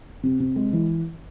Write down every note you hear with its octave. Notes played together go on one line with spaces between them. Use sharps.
C3
C3
G#3
E3